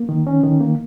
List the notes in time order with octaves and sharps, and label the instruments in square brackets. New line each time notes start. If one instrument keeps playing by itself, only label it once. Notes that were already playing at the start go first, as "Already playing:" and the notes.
Already playing: [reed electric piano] A#3
D#3
C#4
D#3
A#3